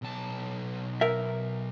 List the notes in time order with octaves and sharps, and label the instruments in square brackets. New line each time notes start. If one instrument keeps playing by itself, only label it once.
[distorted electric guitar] B1 A5
[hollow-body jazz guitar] A#4 E5